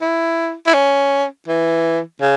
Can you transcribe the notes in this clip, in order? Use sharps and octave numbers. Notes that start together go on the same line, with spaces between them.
E4
E4
C#4
E3
C#3